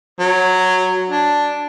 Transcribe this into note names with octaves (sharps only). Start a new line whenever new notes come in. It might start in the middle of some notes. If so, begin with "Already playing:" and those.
F#3
D4